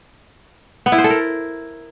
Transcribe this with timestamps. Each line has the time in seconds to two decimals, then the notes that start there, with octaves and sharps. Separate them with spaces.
0.86 B3
0.92 E4
0.98 C5
1.04 A4
1.10 A#4